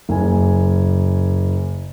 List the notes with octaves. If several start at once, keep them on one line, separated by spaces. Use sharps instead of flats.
F#1 G#5